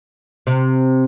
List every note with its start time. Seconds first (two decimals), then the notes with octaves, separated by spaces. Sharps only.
0.47 C3